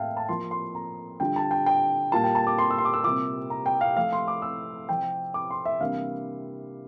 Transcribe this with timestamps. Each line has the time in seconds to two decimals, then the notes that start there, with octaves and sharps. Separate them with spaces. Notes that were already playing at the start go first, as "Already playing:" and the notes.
Already playing: A2 E3 A#3 E4 E5 F5 G5 A5
0.17 A5
0.29 F3 A#3 F4 C6
0.51 C6
0.75 A#5
1.20 D3 G3 D4 F4 G5
1.36 A5
1.51 G5
1.66 G5
2.12 A#2 G3 A#3 F4 A5
2.24 G5
2.35 A5
2.47 D6
2.58 C6
2.70 E6
2.78 C6
2.85 D6
2.94 E6
3.04 C3 G3 A#3 F4 D6
3.50 A#5
3.66 G5
3.81 F5
3.96 F3 A3 E4 F5
4.12 C6
4.28 D6
4.42 E6
4.89 C3 F3 C4 E4 G5
5.34 D6
5.50 C6
5.65 E5
5.80 C3 E3 G3 A#3 D4 F5